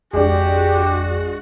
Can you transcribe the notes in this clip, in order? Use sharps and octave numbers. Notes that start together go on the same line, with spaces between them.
G#1 F2 G#3 D4 F#4 G4